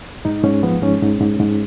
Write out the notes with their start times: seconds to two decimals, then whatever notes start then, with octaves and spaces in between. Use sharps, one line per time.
0.25 G#2 D#4
0.44 G#2 C#4
0.63 F3 B3
0.82 G#2 C#4
1.02 G#2
1.21 G#2
1.40 G#2